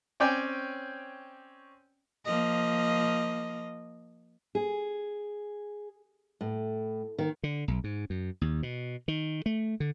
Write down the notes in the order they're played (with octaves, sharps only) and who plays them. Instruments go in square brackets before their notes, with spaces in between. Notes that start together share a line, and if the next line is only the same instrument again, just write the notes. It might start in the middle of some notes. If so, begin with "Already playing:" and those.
[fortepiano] C4 C#4 C#5 D5 G5 G#5
[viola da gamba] F3 A#3 D#5
[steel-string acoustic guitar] G#4
A2
D#3
[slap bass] D3
B1
G#2
F#2
D#2
B2
D#3
A3
D3